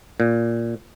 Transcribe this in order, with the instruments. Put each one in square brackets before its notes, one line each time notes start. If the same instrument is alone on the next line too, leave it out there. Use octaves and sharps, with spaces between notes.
[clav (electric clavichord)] A#2